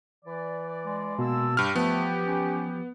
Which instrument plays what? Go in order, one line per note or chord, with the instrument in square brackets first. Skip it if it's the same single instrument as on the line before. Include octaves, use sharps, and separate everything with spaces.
[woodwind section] E3 D5
[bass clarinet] G#3
[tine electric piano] B2 [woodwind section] A#3 A5 E6
[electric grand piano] G2 F6 [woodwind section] G4
[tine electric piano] F3 [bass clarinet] A3 [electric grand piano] B3
[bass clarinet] C#4